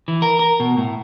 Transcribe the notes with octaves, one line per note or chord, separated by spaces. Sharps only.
E3
A#4
A#4
B2
A2